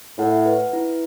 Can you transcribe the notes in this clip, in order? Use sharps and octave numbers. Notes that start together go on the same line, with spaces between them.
A2 F#5
B4
E4